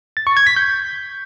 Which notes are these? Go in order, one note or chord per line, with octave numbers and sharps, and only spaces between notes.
A6
C#6
G#6
B6
G6